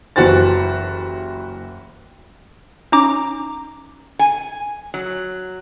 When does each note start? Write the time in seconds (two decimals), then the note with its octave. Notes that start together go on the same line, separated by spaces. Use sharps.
0.16 F#1 E3 F#4 G4 C5 A6
2.92 C#4 D#4 A#5 D6
4.19 G#5
4.94 F#3